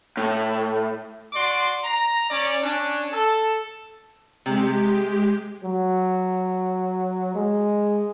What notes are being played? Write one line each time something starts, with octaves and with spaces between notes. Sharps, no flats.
A2
F#4 D5 C6 D6
A#5
C#4 D5
C#4 D4
A4
C3 G#3 G4
F#3
G#3